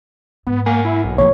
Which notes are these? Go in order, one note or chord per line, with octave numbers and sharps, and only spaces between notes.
G#2 B3
A#3 A#4 F#5 G#5
E4
B1
D2 E3 F3 A#3 C#5